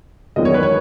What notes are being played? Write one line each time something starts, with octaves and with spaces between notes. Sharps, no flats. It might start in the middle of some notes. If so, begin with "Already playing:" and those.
E1 D#2 D#3 F#3 B3 D#5
C#5
B4
C#5